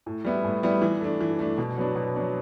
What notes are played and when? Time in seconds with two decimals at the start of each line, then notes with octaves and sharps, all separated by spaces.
0.06 A2
0.25 G3 B3 E4
0.44 A2
0.63 G3 B3 E4
0.82 E3
1.01 A3 D4
1.21 E3
1.39 A3 D4
1.58 B2
1.77 F#3 B3 D4
1.96 B2
2.15 F#3 B3 D4